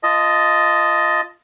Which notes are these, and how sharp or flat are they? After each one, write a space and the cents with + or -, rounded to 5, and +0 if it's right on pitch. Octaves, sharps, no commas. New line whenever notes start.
F4 -20 D#5 +5 A5 +0